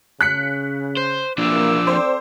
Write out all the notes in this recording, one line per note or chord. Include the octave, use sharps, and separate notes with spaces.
C#3 F#6 B6 C#7
C5
C3 E3 F3 A#3 D4 D6 E6
C4 A4 C5 D5